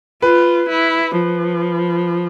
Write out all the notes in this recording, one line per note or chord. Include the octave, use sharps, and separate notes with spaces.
F4 B4
E4
F3